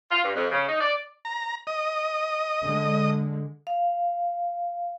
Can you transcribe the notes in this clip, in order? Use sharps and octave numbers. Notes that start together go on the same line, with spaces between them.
F4
G2
F2
C#3
D#4
D5
A#5
D#5
D3 G#3
F5